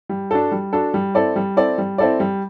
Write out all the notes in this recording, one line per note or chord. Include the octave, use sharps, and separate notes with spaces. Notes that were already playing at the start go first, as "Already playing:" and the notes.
G3
D4 F#4 A4
G3
D4 F#4 A4
G3
C4 E4 A4 D5
G3
C4 E4 A4 D5
G3
C4 E4 A4 D5
G3